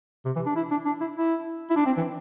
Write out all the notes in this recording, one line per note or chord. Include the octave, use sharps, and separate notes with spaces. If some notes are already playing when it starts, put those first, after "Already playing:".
C3
E3
D4
E4
D4
D4
E4
E4
E4
D4
C4
E3